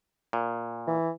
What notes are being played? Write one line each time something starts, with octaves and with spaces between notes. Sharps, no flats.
A#2
E3